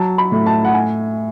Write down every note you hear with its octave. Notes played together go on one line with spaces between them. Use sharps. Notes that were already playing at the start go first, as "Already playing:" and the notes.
Already playing: F#3 A5
B5
A2
A5
F#5
G#5